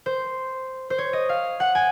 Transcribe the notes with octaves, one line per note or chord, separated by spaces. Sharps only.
C5
C5
C#5
D#5
F5
F#5
G#5